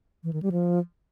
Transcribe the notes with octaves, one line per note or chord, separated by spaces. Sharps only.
E3
D#3
G3
F3